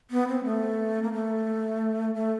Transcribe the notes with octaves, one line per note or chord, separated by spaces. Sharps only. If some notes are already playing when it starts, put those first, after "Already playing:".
B3
C4
A3
A#3
A3
A3